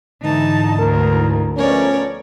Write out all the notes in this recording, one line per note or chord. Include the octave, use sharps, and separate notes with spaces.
G#2 D3 E3 D#4 A5
D2 A#4
F3 A3 B3 C#4 A#4 C#5 D5